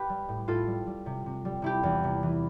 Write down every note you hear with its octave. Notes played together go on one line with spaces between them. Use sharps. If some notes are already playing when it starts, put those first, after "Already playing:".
Already playing: G4 B4
G3
A2
A2 F4 A4
G3
G3
C3
C3
G3
C3 E4 G4
E2
C3
E3